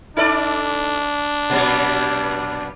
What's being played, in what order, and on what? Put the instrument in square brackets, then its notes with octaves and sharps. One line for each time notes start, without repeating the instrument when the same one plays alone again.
[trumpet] D4 [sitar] D#4 A4 D5
[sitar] A#2 F#3 G3